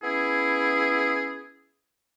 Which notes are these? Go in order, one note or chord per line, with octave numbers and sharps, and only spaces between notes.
B3 C#4 E4 G#4